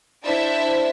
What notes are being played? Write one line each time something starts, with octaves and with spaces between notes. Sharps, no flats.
D4 E4 C5 E5 A5